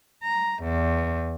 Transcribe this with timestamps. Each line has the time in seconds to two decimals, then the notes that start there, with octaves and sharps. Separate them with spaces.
0.24 A#5
0.64 E2